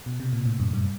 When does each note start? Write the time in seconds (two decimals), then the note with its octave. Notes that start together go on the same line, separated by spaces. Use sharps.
0.06 B2
0.20 C3
0.33 A#2
0.46 A2
0.60 F#2
0.73 G2